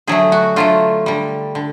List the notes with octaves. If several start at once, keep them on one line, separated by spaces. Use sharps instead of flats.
D3 F#3 A3 G#4
F#4
D3 F#3 A3 F4
D3 G3
D3